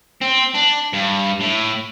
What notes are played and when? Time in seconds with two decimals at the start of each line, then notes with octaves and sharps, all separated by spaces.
0.21 C4
0.54 D4
0.93 G2
1.40 A2